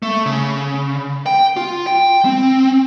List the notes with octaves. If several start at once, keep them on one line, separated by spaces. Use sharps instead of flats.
A3
C#3
G5
F4
G5
C4